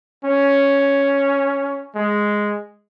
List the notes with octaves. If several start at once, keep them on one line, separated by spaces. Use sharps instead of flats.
C#4
G#3